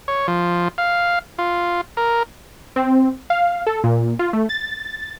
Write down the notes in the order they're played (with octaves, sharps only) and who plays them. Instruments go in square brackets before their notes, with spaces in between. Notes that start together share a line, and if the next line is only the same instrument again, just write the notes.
[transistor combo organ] C#5
F3
F5
F4
A#4
[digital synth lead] C4
F5
A4
A#2
F4
A3
A6